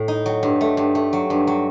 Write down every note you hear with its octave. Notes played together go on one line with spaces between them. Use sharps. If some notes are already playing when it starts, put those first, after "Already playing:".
Already playing: A2
D#4
F#3
G2
A3
G2
A3
F#3
G2
F#3